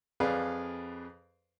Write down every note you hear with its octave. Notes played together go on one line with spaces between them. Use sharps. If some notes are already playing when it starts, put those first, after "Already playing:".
F2 G#4 B4 D5 F5